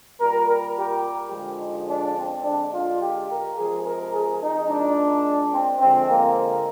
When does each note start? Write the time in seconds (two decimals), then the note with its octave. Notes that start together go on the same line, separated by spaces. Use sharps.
0.20 A#2 G3 A#4
0.48 A#4
0.76 G4
1.32 D3 F3 G#3
1.60 D#4
1.88 D4
2.16 C4
2.44 D3 G#3 D4
2.73 F4
3.01 G4
3.28 A#4
3.56 C3 F3 G#3 G#4
3.85 A#4
4.13 G#4
4.41 D#4
4.69 A#2 G#3 D4
5.53 C4
5.81 D3 F3 G#3 C4
6.09 A#3